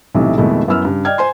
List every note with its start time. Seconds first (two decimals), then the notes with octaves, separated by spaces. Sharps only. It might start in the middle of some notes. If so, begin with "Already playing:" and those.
0.15 B1 A2 C3 E3
0.38 F2 B2 D#3 G#3 A3 E4
0.68 F#2 B3 E4 E6 F6
0.85 G2 C#3
1.05 D5 D#5 G5 F6 G#6
1.18 C5 G#5 C6